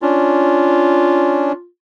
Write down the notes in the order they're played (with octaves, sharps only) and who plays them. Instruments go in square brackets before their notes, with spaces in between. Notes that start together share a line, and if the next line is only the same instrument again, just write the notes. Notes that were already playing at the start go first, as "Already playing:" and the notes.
[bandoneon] C#4 D4 [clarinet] F4